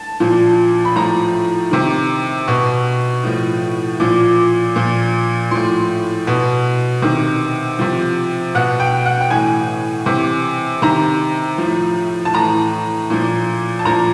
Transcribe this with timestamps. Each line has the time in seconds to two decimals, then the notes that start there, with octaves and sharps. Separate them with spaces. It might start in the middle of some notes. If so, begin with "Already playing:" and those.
Already playing: A5
0.20 A#2 F3
0.85 B5
0.96 A2 F3 A#5
1.71 C3 D#3
2.48 B2 C#6
3.23 A2 F3
4.00 A#2 F3 D6
4.76 A#2 F3
5.51 A2 F3 C6
6.27 B2
7.02 C3 D#3
7.79 C3 F3
8.55 B2 F#5
8.80 G5
9.06 F#5
9.21 G5
9.30 A2 E3 G#5
10.06 C3 E3
10.82 C3 D#3 A#5
11.58 A2 F3
12.25 A5
12.34 A2 E3 A#5
13.10 A#2 F3
13.79 A5
13.85 A#2 F3 A#5